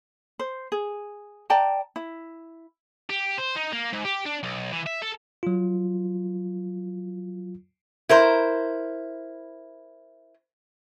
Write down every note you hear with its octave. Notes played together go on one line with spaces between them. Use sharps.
C5
G#4
D5 G5 A5 A#5
E4
G4
C5
D#4
A#3
G#2
G4
D4
B1
E3
E5
A4
F#3 F4
E4 A#4 C5